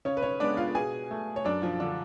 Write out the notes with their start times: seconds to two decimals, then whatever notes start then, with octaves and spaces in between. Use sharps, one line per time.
0.05 C#3 C#4 C#5
0.17 B4
0.22 C#4 C#5
0.40 G#3 B3 D4 D5
0.57 F4 F5
0.75 B2 G#4 G#5
1.11 A3
1.36 C#5
1.45 F#2 D4 D5
1.62 F3 F4
1.80 D3 F3 D4